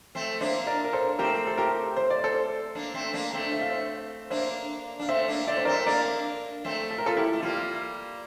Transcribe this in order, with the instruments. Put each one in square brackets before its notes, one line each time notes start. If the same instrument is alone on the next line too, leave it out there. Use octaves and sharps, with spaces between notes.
[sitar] A3 C4
[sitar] A#3 D4 [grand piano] C5 E5
[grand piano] A#4 D5
A#4
A4 C5
[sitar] A3 C4 [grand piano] G4 A#4
[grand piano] A4
G4 A#4
C5
D5
A4 C5
[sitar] A#3 D4
A3 C4
A#3 D4
A3 C4
[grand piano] E5
F5
C5 E5
[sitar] A#3 D4 [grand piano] C5 E5
[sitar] D4 [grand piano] F5
[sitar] A3 C4 [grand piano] C5 E5
[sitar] A#3 D4
[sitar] A3 C4 [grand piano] D5
[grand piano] C5
[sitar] A3 C4 [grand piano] A#4 D5
[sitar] A#3 D4 [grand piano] A#4 D5
[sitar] A3 C4
[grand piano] A4
A#4
F4 A4
E4 G4
[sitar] A3
[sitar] G3 A#3 [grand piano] F4